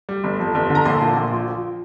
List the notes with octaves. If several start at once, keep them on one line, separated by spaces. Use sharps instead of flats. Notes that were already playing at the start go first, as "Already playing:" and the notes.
G3
G1
F2
G1
D3
A#5
A#1 C6
A#2
A#1
F3
F3